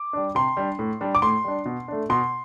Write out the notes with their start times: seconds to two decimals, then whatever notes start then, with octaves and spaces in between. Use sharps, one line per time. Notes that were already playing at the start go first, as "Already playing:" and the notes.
Already playing: D6
0.13 G3 D4
0.35 C3 C6
0.57 G3 D4
0.79 A2
1.01 G3 D4
1.15 D6
1.22 A2 C6
1.44 G3 D4
1.65 B2
1.88 A3 D4
2.10 B2 C6